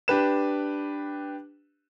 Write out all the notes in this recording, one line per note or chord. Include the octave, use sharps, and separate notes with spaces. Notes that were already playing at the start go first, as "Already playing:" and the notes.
D4 G4 B4 E7